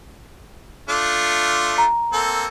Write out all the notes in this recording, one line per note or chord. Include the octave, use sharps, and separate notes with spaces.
A3 D4 F4
A#5
A#3 C4 A4